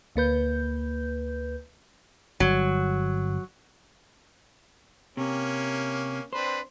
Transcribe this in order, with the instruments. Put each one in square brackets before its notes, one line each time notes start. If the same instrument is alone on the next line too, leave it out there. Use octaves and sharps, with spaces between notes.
[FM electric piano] D2 A#3 B4 G6
[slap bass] G1 [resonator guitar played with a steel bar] F#3
[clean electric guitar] C3 [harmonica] A#3 C#4
[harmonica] C4 D4 B4 [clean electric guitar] C5